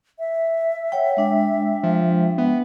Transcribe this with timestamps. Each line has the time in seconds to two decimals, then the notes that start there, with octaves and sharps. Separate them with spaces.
0.19 E5
0.92 C#5 F#5 G5
1.17 G#3 D4 G5
1.83 F3
2.38 B3